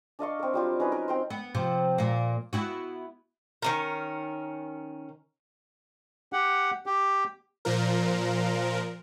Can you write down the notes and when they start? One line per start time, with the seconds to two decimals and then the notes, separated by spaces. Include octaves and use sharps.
0.19 D4 D#5 F5 C#6
0.39 C4 A#4
0.54 F#3 G3 F4
0.80 C#4 D#4 B4
0.92 A#4
1.08 C4 G5 C6
1.30 B3
1.55 C3 F3
1.98 A#2 A#3
2.53 B3 E4 F#4
3.62 D#3 C#4 A#4
6.33 G4 F#5
6.86 G4
7.65 A#2 F3 A#4